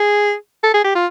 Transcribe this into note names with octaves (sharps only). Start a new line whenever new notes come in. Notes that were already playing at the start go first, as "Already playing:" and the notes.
Already playing: G#4
A4
G#4
G4
F4